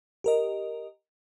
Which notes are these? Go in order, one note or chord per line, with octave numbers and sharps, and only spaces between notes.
G4 A#4 D#5